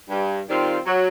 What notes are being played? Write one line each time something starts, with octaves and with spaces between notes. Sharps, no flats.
G2
D#3 G3 C4 F4
F#3